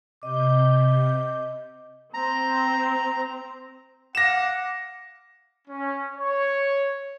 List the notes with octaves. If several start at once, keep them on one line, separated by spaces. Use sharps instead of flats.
C3 D#5 D6 G6
C4 A#5
F5 F#5 D6 A#6 E7
C#4
C#5